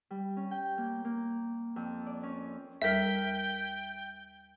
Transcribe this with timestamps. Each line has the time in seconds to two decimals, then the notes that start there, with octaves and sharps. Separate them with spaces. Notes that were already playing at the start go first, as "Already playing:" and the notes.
0.10 G3
0.37 C#4
0.51 G5
0.78 A#3
1.05 A#3
1.76 F2
2.06 D5
2.23 C#4
2.82 D#2 G3 A#4 E5 G5 B6